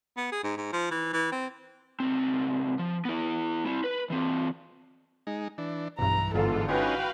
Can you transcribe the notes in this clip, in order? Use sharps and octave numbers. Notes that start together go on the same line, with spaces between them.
B3
G#4
G#2
G#2
F3
E3
E3
C4
C#2 C4
F3
B3 E4
C4 E4
B4
E3 C4
G#3 D#4
E3 D4
B1 G2 E3 A#5
G1 G#2 D3 B3 F4 A4
C#4 D#4 F#4 B4 F5 G5 G#5